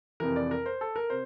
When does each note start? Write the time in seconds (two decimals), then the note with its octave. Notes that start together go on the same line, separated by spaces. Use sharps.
0.20 F2 C3 E3 A#4
0.36 D5
0.51 A#4
0.66 C5
0.81 A4
0.96 A#4
1.10 C3 C5